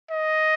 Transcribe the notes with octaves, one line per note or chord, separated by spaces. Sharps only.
D#5